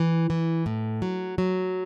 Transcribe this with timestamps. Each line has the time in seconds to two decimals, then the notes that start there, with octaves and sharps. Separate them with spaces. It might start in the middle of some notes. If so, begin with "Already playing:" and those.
Already playing: E3
0.30 E3
0.66 A2
1.02 F#3
1.38 F#3